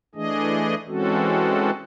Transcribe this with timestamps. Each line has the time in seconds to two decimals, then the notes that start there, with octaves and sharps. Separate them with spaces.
0.15 E3 A3 D4 G#4 D#5
0.88 E3 G#3 C4 C#4 F#4 A4